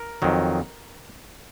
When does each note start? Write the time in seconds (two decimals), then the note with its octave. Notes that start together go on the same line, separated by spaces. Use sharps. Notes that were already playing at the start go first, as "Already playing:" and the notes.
Already playing: A#4
0.22 F2 D#3 F#3